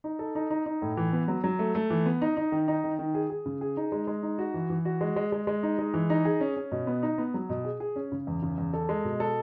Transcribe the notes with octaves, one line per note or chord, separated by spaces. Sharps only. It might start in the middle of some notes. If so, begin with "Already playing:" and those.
D#4
A4
D#4
D#4
D#4
A2
E3
B3
F#3
F#3
A3
A3
E3
B3
D#4
D#4
D#3
D#4
D#3
D#3
G#4
G#4
C#3
G#4
D#4
G#3
G#3
D#4
F#4
E3
E3
F#4
G#3
G#3
G#3
G#3
D#4
G#3
E3
D#4
G#4
C#4
C#4
B2
B3
D#4
B3
F#3
B2
G#4
G#4
C#4
C#3
E2
C#3
E2
A4
G#3
B2
A4